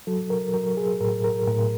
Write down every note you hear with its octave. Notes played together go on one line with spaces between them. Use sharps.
F#3 A4
A#4
F#3 A#4
G#4
A2 A#4
A#4
A2 A#4